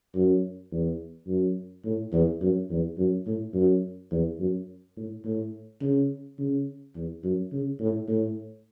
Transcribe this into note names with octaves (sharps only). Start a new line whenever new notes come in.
F#2
E2
F#2
A2
E2
F#2
E2
F#2
A2
F#2
E2
F#2
A2
A2
C#3
C#3
E2
F#2
C#3
A2
A2